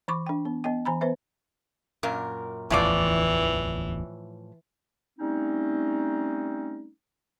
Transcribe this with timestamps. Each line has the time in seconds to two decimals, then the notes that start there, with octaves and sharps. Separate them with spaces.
0.08 E3 B5 C#6 D6
0.26 D4 G5
0.45 B3
0.64 B3 D#5 G5
0.85 E3 G#5 A#5 B5
1.01 B3 B4 C5 E5
2.03 F#2 A#2 A#4
2.70 D1 A1 E2 A2 E3 F3 D5
5.19 G3 A3 C4 C#4 D#4